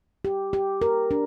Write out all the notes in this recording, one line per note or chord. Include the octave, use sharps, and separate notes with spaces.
G4
G4
A#4
D4